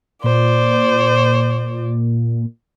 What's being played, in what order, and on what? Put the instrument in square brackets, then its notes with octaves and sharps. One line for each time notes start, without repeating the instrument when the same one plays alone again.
[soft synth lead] A#2 [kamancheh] C5 D5